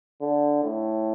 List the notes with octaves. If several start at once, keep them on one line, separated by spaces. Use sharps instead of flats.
D3
A2